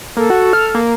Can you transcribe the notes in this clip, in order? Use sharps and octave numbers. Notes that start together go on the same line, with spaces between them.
A#3 A4
F#4
F6
A#3